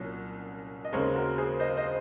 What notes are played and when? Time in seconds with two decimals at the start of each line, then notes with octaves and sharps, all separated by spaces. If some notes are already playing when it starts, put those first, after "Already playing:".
Already playing: C2 A#2 F#3 C#4
0.85 D#5
0.92 D#2 C#3 G#3 C4 A#4 C#5
1.15 F#4 A#4
1.38 G#4 C5
1.60 C5 D#5
1.77 C5 D#5